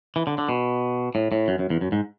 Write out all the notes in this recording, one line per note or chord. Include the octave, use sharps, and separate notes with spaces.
E3
D3
D3
B2
A2
A2
F#2
F#2
E2
F#2
G#2